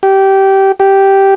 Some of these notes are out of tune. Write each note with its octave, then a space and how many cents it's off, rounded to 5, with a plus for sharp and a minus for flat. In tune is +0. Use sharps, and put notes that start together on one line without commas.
G4 -20
G4 -10